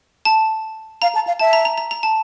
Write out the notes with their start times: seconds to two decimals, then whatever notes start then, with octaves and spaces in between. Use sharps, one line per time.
0.25 A5
1.02 F5 A#5
1.15 A5
1.27 F5
1.40 E5 A5
1.53 A#5
1.65 A#5
1.78 A#5
1.91 A#5
2.03 A5